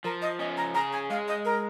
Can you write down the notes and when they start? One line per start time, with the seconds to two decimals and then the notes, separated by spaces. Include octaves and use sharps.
0.04 F3 A#4
0.22 D#5
0.39 C#4 D#5
0.57 A#5
0.75 G#4 A#5
0.93 G#5
1.10 G#3 F5
1.28 D#5
1.45 A#4